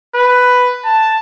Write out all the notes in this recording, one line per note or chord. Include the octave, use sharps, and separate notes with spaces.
B4
A5